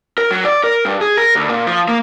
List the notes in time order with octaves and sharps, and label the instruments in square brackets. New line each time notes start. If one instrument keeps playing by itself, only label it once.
[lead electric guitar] A#4
F#3
D5
A#4
G2
G#4
A#4
D2
A#2
F3
A#3